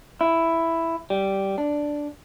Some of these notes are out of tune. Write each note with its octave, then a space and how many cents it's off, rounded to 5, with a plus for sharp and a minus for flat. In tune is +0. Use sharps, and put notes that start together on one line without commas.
E4 +5
G3 -10
D4 +0